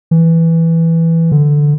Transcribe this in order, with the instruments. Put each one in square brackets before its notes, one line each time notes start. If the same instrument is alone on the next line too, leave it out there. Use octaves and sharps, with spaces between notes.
[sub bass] E3
D3